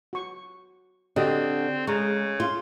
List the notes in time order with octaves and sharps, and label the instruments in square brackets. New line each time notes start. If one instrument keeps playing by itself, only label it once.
[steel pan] F#4 C#6
[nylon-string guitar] D3 [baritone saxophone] C4 [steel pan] F#4 G4 D#5
[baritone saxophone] C#3 [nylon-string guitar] G#3 [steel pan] G#4 A#5 C#6
[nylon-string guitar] F4 [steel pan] G#4 F5